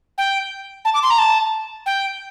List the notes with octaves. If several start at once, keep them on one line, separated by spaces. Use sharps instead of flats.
G5
A5
D6
C6
A#5
A5
G5